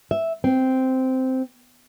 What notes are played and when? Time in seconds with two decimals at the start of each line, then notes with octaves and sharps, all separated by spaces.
0.11 E5
0.44 C4